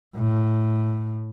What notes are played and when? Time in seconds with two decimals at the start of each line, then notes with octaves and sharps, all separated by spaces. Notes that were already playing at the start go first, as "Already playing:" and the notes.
0.16 A2